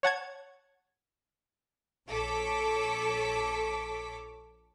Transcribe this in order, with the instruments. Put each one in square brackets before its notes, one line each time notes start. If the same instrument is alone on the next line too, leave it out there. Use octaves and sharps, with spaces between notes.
[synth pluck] C#5 F#5 A5 G#6
[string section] A#1 A4 C#5 D6 B6